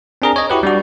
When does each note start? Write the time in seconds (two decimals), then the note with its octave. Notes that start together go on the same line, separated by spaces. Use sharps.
0.22 C4 D4 G#4 A#4 A#5
0.36 C#5 D#5
0.50 E4 F#4 G4 B4
0.63 G3 D4 F#4